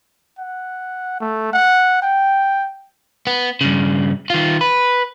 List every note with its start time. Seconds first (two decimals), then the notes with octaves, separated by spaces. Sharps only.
0.39 F#5
1.20 A3
1.53 F#5
2.02 G5
3.27 B3
3.61 G2 C#3
4.30 D#3 F4
4.61 B4